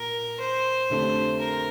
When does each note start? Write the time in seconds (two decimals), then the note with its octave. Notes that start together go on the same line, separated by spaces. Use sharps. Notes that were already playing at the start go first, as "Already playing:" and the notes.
Already playing: A#2 A#4
0.40 C5
0.90 F2 D3 A3 D4 G4
1.40 A#4